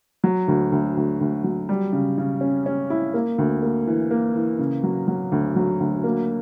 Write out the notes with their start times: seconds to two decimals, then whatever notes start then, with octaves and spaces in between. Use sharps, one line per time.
0.24 F#3
0.48 D2
0.72 D2
0.97 D2
1.21 D2
1.44 F#3
1.69 G3
1.93 C#3
2.18 C#3
2.41 C#4
2.66 C#4
2.90 E4
3.14 A#3
3.38 D2
3.62 A#3
3.87 E3
4.11 A#3
4.35 E3
4.59 C#3
4.83 F#3
5.08 F#3
5.32 D2
5.56 F#3
5.80 D2
6.04 A#3